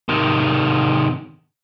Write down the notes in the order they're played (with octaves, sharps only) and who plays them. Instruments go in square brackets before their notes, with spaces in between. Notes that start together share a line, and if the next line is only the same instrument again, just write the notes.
[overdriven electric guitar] C3 D#3